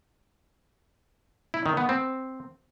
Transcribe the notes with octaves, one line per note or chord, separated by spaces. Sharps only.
E4
D#3
B3
C4